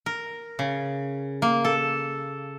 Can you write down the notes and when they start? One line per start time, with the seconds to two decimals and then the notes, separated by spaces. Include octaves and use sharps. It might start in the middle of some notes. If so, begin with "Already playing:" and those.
0.06 A#4
0.59 C#3
1.42 A#3
1.65 A4